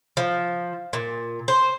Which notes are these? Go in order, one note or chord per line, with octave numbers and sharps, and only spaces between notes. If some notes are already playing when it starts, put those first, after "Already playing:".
F3
A#2
C5